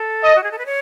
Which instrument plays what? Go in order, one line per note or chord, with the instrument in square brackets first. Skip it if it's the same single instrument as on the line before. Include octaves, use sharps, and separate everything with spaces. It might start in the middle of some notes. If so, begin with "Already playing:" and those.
Already playing: [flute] A4
[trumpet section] D#5
[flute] F#4
G#4
A4
B4
C#5